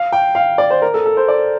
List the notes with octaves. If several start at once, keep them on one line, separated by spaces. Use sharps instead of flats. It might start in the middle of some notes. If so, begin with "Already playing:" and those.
Already playing: F5
G5
F5
D5
C5
A#4
A4
A4
C5
D5